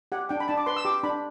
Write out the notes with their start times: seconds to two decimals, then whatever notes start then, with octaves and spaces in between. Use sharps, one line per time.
0.12 G4 F#5
0.29 D4 G5
0.40 B5
0.48 D4 A5
0.57 D6
0.66 B4 C6
0.77 E6
0.85 G4 D6
1.03 D4 B5